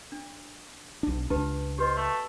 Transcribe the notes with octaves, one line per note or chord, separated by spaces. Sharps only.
D4
B1 D4
C#2 D4 G4 B4 A5
G4 B4 C5 D#5
A3